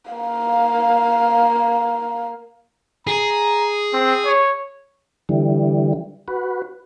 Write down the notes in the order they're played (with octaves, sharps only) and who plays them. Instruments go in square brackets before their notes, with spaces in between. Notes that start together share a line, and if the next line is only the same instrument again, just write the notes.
[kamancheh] A#3 F5
[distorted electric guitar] G#4 [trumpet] A#5
[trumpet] C4
C#5
[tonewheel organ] D3 E3 G3
F#4 B4